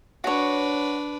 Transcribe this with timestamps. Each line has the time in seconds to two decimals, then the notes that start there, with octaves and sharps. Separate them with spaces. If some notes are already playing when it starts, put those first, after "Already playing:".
0.24 D4 F#4 B4 C#5